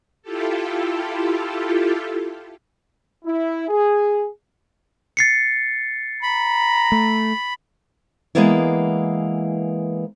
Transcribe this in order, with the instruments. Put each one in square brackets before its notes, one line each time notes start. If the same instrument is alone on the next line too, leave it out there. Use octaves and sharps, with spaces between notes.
[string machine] E4 F4 G4 A4
[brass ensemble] E4
G#4
[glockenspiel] A6 C7 C#7
[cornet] A#5 [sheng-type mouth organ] B5
[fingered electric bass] A3
[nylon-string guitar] E3 F3 G#3 A#3 B3 E4